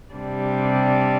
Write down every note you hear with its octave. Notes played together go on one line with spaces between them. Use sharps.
C3 G3 D4